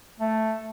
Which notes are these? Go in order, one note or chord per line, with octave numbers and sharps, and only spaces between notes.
A3